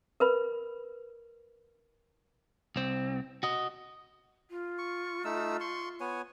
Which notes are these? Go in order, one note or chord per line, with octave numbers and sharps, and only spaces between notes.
A#4 B4 B5
C2 C4
F#4 D#5
F4
C#6
A3 D#4 E6
C6 C#6
B3 C#5 G#5